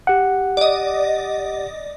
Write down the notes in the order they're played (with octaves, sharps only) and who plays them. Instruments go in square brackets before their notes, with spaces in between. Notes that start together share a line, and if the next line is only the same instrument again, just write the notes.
[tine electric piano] G4 F#5
[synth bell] D5 D#5